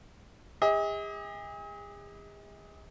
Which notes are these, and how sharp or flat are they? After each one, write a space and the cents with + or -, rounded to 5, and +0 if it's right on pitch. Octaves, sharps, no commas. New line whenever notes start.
G#4 -40 D#5 +40